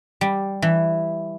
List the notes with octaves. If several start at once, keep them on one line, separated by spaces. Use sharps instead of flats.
G3
E3